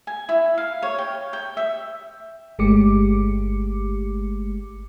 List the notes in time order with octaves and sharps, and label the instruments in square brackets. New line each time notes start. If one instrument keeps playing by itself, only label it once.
[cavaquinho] G#5
E4
F5
C#5
G5
G5
E5
[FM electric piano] G1 G#3 A3 G4 D6 C#7